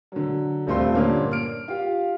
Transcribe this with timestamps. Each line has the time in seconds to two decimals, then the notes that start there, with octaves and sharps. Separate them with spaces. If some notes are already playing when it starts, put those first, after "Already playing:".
0.12 D3 F#3
0.67 D#1 G2 A3 C4 F4 C6
0.95 G2 A#2 D3 A#3 C#4
1.31 F6 D7
1.68 F4 G4 F5